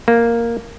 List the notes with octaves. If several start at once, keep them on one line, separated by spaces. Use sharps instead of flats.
A#3